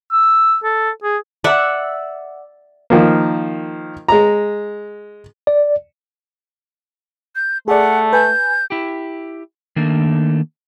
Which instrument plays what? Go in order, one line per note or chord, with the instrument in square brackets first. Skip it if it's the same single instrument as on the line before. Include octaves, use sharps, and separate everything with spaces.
[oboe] E6
A4
G#4
[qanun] D5 E5 F#5
[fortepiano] D#3 F3 A#3
G#3 A#5
[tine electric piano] D5
[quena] G6
[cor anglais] A3 [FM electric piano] G#4 D5 [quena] F#5
[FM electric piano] B4 G#5 [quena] G6
[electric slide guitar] E4 G4
D#3 A3 A#3 D4